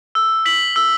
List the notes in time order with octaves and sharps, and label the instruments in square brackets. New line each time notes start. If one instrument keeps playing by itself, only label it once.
[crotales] E6
B6 F#7
E6